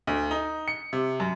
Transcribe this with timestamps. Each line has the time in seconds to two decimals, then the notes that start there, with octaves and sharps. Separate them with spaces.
0.07 D2
0.31 D#4
0.68 C#7
0.93 C3
1.20 F#2